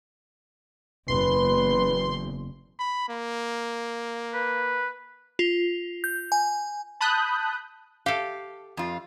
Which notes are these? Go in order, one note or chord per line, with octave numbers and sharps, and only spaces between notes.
F#1 E2 B4 C6
B5
A#3
B4
F4
G6
G#5
A5 B5 D#6 F#6 G6
G4 A4 F5
F2 F4